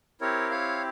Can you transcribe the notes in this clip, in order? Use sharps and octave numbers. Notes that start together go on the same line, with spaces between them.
C4 E4 G4 A#4 C#5
C#5 F5